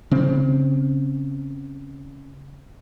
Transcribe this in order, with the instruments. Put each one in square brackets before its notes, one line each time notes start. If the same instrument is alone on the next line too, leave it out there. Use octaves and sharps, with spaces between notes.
[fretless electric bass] C#3 C4